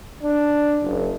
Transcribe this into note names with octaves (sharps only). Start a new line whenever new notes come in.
D4
F#1